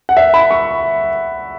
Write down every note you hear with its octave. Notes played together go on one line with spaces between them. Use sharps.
F#5
E5
B5
C#6